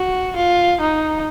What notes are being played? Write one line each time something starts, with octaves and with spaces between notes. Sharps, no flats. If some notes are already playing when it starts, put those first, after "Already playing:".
Already playing: F#4
F4
D#4